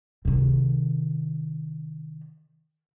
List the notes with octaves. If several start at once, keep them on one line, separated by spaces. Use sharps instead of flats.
C3 D#3